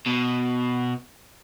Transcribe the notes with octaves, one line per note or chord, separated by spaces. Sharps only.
B2